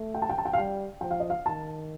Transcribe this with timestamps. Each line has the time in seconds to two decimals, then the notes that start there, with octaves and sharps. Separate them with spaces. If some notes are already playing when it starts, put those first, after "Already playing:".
Already playing: A3
0.14 G5
0.22 A5
0.29 G5
0.38 A5
0.45 G5
0.53 F5
0.58 G3 G5
1.01 F3 G5
1.11 F5
1.20 D#5
1.30 F5
1.45 D#3 A5